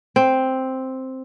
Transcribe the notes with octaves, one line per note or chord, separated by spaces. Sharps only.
C4